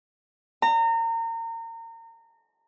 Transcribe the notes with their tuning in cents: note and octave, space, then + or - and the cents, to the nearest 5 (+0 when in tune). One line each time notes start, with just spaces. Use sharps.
A#5 -30